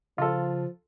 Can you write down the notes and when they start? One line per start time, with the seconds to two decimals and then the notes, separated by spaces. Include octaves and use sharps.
0.18 C#3 F3 F4 A4